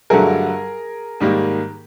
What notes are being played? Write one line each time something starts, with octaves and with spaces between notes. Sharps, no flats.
G2 D3 F#3 A3 G#4 A#4
G#2 D#3 G3 A#3